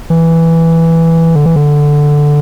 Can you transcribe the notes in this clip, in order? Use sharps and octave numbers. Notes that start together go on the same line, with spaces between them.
E3
D3
E3
D3